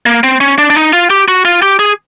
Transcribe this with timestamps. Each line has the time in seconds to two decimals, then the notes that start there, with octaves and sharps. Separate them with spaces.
0.06 A#3
0.24 C4
0.40 C#4
0.58 D4
0.70 D4
0.76 D#4
0.93 F4
1.10 G4
1.28 F#4
1.45 F4
1.62 G4
1.79 G#4